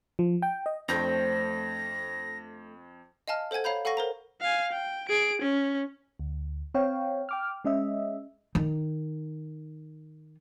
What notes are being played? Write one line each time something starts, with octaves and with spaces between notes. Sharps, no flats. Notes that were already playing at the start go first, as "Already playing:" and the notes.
F3
G5
D#5
F2 A3 C4 D4 G6 A#6
D#5 F5 G#5 A5 F6
A4 C5 F#5 G#5 G#6
C#5 F5 A#5 B5 G6
A4 F5 F#5 G#5 C#6 A#6
A#4 C5 A#5
F5 G#5
G5
G#4 D7
C#4
D2
C4 C#5 F5 G5
G5 D6 F6
G#3 C#4 D#5 E5
D#3 D#4